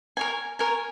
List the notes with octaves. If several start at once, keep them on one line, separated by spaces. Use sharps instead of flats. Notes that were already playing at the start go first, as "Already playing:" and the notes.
A#4 C#5 G#5
A#4 C#5 G#5